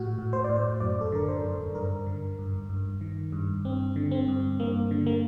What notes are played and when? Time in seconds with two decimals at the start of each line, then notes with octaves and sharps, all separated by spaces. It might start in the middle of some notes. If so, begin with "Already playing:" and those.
Already playing: A2 F#4
0.18 A2
0.33 C5
0.44 D5
0.49 A2
0.56 C5
0.80 F#2 D5
1.01 A4
1.12 D3 A#4
1.29 C5
1.43 F#2
1.75 G2 A#4
2.06 D3
2.39 G2
2.69 G2
3.01 D#3
3.32 G2
3.65 G2 C4
3.96 D3
4.11 C4
4.28 G2
4.60 G2 A#3
4.91 D3
5.06 A#3